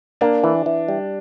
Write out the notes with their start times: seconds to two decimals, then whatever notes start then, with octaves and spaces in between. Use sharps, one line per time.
0.21 A#3 D4
0.44 E3
0.66 E3
0.88 G3